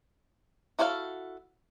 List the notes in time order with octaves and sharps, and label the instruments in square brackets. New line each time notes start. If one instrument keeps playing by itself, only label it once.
[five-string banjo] E4 F#4 A4 C5 F5